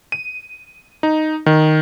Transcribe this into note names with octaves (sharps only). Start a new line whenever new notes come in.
D#7
D#4
D#3